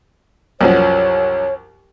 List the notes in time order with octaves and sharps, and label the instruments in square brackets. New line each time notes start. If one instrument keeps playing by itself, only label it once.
[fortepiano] C2 F#2 F3 [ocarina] C#5